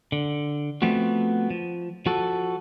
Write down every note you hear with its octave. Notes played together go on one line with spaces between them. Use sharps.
D3
F3 A3 B3 C4 F#4
F3
F3 F#4 A4